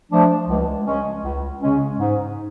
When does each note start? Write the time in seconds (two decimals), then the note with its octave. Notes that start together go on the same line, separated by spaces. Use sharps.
0.11 F3 A3 D4
0.48 C#2
0.86 C#3 G#3 C#4
1.24 C#2
1.61 C#3 G#3 C#4
1.99 G#2